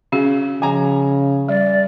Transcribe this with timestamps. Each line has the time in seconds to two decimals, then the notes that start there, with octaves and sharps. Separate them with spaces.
0.12 C#3 C#4 F#4
0.62 C#3 F3 G#5 A#5
1.49 G3 D5